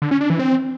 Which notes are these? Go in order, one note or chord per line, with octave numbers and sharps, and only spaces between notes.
D3
C#4
D4
E3
C4